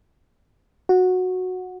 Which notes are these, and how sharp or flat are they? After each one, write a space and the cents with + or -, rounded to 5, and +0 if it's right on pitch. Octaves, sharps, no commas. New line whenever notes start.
F#4 -10